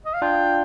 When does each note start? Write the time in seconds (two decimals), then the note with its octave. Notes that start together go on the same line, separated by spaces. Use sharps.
0.06 D#5
0.14 F5
0.22 D4 F4 G5